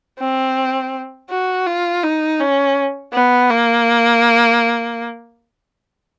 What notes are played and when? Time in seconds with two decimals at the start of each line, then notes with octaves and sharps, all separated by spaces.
0.20 C4
1.30 F#4
1.66 F4
2.03 D#4
2.40 C#4
3.13 B3
3.50 A#3